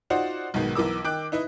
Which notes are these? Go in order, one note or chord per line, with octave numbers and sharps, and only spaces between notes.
D#4 F4 F#4 C5 D5 F#5
B1 G#2 B2 D#3
B1 E3 A#4 D6 E6
D#3 G5 D6 F#6
D#4 E4 B4 D#5